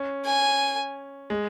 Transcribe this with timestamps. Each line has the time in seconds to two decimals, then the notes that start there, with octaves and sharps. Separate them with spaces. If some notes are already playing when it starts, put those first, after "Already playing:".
Already playing: C#4
0.25 G#5
1.30 G#3